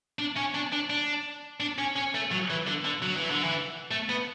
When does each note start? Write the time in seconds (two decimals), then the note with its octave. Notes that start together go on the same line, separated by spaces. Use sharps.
0.19 D4
0.37 C#4
0.54 D4
0.72 D4
0.90 D4
1.60 D4
1.78 C#4
1.96 C#4
2.14 A3
2.31 F#3
2.50 E3
2.67 D3
2.85 D3
3.02 F#3
3.16 E3
3.30 D3
3.44 E3
3.91 A3
4.09 B3